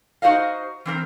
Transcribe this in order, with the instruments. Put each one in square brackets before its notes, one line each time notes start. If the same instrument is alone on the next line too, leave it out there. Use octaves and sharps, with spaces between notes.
[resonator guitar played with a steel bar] D#4 F#4 C5 D#5 F5
E3 C4 A#4